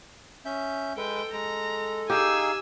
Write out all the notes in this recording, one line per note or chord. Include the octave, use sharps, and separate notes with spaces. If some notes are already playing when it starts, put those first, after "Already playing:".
C#4 E5 G6
G#3 A4 B4 G5
G#3 A#5
D#4 G4 G#4 F5 G#5 E6